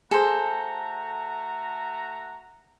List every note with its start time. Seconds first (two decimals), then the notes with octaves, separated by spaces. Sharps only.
0.11 A3 F#4 G#4 A4 C5 A#5